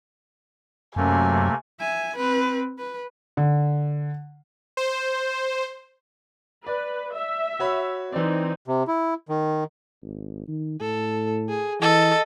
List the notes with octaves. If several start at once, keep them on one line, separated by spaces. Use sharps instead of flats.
F#2 C3 A3 A#3 G#5
E5 G#5
C4 B4
B4
D3
C5
B4 D5
E5
F#4 C#5 B5
E3 C4 D#4 D5
C3
E4
D#3
G#1
D#3
A2 A4
G#4
E3 A4 D#5